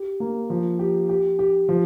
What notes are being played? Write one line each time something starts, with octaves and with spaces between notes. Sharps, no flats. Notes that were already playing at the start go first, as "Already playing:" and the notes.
Already playing: G4
A#3
F3
G4
G4
G4
F3